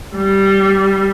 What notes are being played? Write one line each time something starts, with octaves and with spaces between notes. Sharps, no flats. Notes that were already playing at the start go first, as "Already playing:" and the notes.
G3